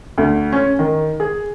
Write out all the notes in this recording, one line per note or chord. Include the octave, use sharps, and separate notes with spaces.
D2
C#4
D#3
G#4